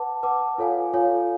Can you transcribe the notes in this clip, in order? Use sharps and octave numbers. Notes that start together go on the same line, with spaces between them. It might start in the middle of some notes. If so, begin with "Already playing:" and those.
Already playing: B4 F#5 A5 D6
B4 F#5 A5 D6
F4 A4 C#5 F5 G#5
F4 A4 C#5 F5 G#5